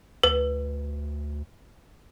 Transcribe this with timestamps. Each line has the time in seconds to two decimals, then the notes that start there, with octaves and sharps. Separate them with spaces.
0.23 D2 B4